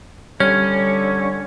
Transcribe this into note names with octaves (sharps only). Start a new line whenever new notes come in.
D3 G3 C#4 C#5 F6